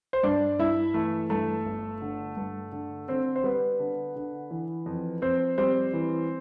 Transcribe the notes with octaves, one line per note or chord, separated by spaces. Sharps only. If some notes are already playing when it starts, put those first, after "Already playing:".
C5
G2 D4 D5
G2 E4 E5
E3 A3 A4
G2 A3 A4
G1
D3
G2
D3
D3 C4 C5
C5
G3 B3 B4
D3
D3
E3
F2
F2 C4 C5
G3 C4 C5
E3